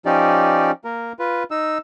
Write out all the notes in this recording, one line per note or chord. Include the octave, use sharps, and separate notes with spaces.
F3 C#4 D#4 G4 D5
A#3 A#4
F4 B4
D#4 E6